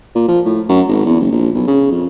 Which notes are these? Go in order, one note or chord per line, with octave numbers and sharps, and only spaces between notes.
A#2
F3
A2
F#2
G#1
E2
F#1
A#1
B1
C#3
F2